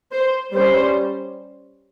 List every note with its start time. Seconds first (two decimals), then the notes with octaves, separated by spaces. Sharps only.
0.12 C5
0.53 G3 C#4 C5